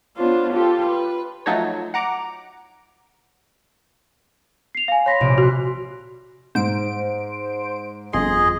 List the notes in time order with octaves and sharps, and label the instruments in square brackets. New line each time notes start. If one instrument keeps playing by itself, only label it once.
[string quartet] B3 D4 F4 C5 C#5
F4 G4 A4
B4
[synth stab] F3 F#3 A3 D#4 A4 C#5
F#5 A#5 D6
[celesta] C7 F7
F5 G#5
[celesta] C#5 A#6 B6 [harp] B5 C6
[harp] A#1 C3 D7
[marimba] F#4 [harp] C6 F#6
[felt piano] G#2 [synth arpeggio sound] C5 D7
[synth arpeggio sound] G1 F2 C6 [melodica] G#4 D#5